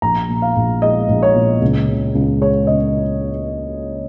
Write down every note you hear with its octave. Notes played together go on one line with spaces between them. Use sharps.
A#1 A#5
A#2
F5
A#1
G#3 D#5
A#1
C#5
A#2
C#2
C#3
C#2
G#3 C#5
C#2 D#5